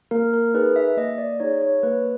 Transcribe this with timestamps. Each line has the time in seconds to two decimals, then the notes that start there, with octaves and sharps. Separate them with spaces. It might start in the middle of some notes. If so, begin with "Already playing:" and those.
0.11 A#3 A#4
0.33 A#4
0.54 D#4 G#4 B4
0.76 E5
0.97 A#3 D#5
1.18 D5
1.40 D#4 G#4 C#5
1.62 C#5
1.83 A#3 B4